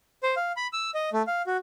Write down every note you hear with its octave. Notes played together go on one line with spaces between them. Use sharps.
C5
F5
B5
E6
D#5
A3
F5
F#4